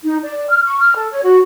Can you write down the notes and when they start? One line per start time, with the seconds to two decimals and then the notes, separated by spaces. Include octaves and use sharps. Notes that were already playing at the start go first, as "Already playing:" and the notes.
0.04 D#4
0.24 D5
0.50 F6
0.64 C#6
0.81 F6
0.96 A4
1.11 C#5
1.24 F#4